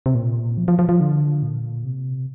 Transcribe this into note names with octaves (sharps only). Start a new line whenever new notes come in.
C3
A#2
F3
F3
F3
F3
D3
A#2
C3